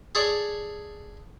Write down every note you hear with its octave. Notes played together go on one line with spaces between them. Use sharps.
G#4 A4 C#5 D5